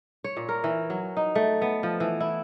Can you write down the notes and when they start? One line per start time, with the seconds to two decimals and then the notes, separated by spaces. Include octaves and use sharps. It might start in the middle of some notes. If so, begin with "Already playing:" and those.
0.24 C#5
0.37 A#2
0.49 A#4
0.64 E3
0.90 F#3
1.17 D#4
1.35 A3
1.62 B3
1.83 F3
2.00 E3
2.20 E4